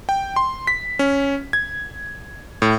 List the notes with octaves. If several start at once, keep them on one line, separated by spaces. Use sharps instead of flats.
G5
C6
B6
C#4
G#6
A2